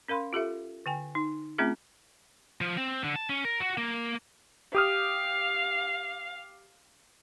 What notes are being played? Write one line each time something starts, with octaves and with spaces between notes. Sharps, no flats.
C#4 A#4 F5 B5 C6
F4 G4 A4 E5
D3 G5 G#5
D#4
A3 C4 C#4 F4 G#4 E5
F3
C4
D3
A5
C#4
A#4
F#4
A#3
G4 F5 D#6 F6